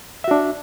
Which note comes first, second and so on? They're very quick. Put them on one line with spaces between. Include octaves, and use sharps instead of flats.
E5 F#4 D4